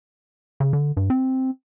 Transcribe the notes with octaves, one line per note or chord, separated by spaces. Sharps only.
C#3
D3
G2
C4